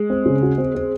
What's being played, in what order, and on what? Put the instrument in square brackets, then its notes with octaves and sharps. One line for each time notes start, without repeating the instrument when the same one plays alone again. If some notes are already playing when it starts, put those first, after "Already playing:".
Already playing: [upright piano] G#3
[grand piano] C4
C#3
F#4
C4
C4